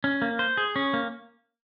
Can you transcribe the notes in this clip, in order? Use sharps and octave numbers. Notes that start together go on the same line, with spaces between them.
C#4
A#3
C5
G#4
C#4
A#3